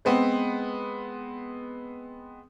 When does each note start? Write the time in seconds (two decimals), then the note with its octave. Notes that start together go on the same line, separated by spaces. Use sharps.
0.05 G#3 B3 C4